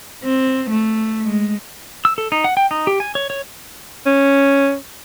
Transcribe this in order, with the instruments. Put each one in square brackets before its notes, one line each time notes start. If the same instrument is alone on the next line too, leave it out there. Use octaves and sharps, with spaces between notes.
[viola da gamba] C4
A3
G#3
[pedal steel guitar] E6
A4
D#4
F#5
G5
D#4
G4
G#5
C#5
C#5
[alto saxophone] C#4